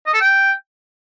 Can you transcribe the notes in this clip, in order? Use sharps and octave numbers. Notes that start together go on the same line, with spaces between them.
D#5
A4
G5